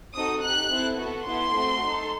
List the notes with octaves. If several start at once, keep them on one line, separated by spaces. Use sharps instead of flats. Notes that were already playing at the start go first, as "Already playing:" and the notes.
C4 D#4 F#4 A4 D#6
D#4 G4 F#6
C4 E4 A4
B3 F#4 A4
B3 E4 A4 C6
A3 C4 F#4 A4
D#4 A4